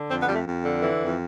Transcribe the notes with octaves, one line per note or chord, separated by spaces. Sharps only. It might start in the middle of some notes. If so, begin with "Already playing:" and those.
Already playing: D3
F2 C4
B3
F2 G3
A3
F2
D3
E3
F2